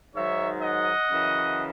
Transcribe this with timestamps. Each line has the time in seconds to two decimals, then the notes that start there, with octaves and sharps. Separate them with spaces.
0.14 G#2 D#3 F#3 C#5 E5
0.62 D#5 F#5
1.11 F#2 C#3 E3